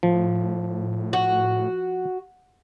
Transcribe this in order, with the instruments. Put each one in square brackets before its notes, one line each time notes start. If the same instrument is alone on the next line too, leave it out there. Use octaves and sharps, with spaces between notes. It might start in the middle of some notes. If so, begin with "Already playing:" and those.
[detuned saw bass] A2 [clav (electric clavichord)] F3
[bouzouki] F#4